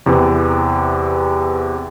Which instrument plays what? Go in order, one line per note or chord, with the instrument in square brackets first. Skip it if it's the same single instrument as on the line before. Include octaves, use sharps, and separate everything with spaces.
[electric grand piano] E2 C3 E3